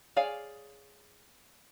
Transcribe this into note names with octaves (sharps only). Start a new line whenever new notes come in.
G#4 C#5 D5 F5 G#5